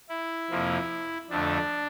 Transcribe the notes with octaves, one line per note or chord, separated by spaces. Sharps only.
E4
F2 C3 F3 A#3
F2 D3 A3 D4